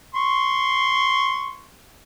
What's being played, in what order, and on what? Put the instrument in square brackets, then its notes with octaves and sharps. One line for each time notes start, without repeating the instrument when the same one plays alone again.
[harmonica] C6 C#6